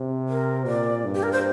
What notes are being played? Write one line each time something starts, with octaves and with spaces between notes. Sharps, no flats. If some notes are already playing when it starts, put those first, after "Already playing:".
Already playing: C3
A#4
A#2 D5
G2
G4
A#4
C5